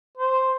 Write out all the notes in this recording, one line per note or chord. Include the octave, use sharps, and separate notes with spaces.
C5